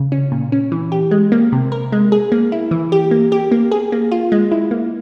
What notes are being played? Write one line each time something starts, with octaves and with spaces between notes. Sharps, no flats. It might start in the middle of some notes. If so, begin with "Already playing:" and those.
Already playing: C#3
C#4
A#2
C#4
E3
G4
G#3
A#3
C3
A#4
G#3
G#4
A#3
E4
E3
G4
A#3
G4
A#3
G#4
A#3
F4
G#3
E4
A#3